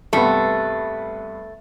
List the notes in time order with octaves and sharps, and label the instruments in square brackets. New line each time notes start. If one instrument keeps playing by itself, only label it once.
[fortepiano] G2 C3 B3 [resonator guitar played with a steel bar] A3